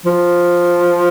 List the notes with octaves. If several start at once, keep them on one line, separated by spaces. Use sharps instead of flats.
F3